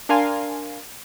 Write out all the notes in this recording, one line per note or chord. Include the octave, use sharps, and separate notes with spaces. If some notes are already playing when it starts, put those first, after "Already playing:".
D4 A#4 F5 G#5 C6